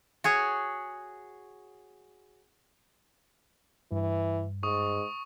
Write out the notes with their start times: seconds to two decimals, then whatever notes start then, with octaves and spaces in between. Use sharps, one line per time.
0.24 F#4 G#4 C#5
3.92 G2 E3
4.63 G#2 C#6 D#6